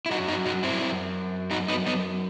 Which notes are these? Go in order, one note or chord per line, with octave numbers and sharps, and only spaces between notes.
E4
F#2 F#3 D#4 F#4
D#4 F#4
D#4 F#4
C4 E4
D#4 F#4
B3 D#4
B3 D#4